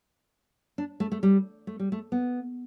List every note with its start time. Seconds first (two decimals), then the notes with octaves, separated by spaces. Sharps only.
0.78 D4
1.00 A3
1.12 A3
1.23 G3
1.67 A3
1.79 G3
1.92 A3
2.12 B3